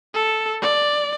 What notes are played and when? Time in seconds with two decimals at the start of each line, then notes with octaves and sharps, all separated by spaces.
0.15 A4
0.62 D5